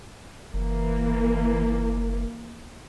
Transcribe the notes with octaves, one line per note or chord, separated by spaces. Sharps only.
F#1 E3 A#3